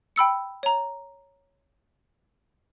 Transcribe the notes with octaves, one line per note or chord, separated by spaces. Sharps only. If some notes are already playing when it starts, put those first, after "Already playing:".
G5 B5 E6 C#7
C#5 A#5